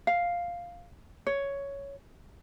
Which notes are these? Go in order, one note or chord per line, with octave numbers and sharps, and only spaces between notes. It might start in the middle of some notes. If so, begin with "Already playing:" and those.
F5
C#5